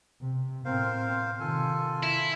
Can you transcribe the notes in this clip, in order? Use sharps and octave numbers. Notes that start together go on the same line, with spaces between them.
C3
A2 C4 A#4 C5 F5
C3 D#3 F4 A4 G#5
E4